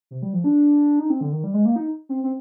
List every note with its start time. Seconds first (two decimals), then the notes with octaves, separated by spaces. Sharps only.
0.11 C3
0.22 G3
0.33 F3
0.44 D4
0.99 D#4
1.10 C4
1.21 D3
1.32 D#3
1.44 G3
1.54 G#3
1.65 A#3
1.76 D#4
2.09 C4
2.24 C4